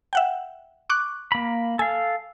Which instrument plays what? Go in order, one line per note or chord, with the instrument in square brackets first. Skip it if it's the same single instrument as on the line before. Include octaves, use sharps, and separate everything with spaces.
[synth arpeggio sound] E5 F#5 G5
C#6 D6 F#6
[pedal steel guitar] A#3 B5
[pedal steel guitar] A4 F5 [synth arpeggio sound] G#5